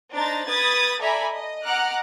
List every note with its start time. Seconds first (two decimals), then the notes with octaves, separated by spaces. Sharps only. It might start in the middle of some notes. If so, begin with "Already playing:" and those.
0.13 D4 D#4 C5 A#5 A6
0.48 B4 B5 D#6 G#6 A6
1.00 A4 D5 E5 G#5 A#5 B5
1.33 D#5
1.65 D#5 F#5 A#5 D6 F6 F#6